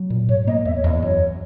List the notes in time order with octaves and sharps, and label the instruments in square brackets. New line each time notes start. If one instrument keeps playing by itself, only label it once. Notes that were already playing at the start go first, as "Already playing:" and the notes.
Already playing: [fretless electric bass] F#3
A#2
[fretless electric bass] G#2 [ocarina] C#5
[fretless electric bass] A#3 [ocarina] D#5
[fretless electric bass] E2 [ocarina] E5
[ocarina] C#5
[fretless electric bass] E2 [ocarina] D#5
[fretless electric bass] F#2 [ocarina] C#5